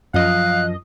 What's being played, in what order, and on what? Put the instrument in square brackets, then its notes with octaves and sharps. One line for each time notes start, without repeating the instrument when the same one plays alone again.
[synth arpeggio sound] F#2 D#5 [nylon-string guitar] F3 [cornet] F5 [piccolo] F#6